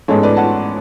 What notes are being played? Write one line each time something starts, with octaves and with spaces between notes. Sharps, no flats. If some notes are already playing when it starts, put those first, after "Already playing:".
A1 G#2 G#3 B3 A4 C#5
B4 D5
F#5 A5